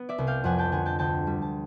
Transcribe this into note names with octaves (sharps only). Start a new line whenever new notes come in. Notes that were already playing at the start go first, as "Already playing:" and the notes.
Already playing: B3
D5 E5
C2
F5 G5
F2 F#5 G#5
G5 A5
D3 F#5 G#5
G5 A5
D2 G5 A5
G3
A5